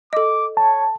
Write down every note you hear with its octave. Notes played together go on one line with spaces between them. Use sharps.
A4 D#5 D6
C#5 A5